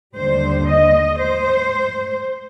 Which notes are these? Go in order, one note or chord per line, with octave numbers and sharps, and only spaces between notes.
D#2 D3 G3 C5
D#5
C5